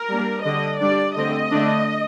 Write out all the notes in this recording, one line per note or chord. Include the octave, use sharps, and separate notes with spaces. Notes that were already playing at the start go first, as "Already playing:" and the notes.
Already playing: A#4
G3 A#3 D4
D3 G3 D4 D#5
G3 D4 D5
D3 A3 C4 D#5
D3 A3 D4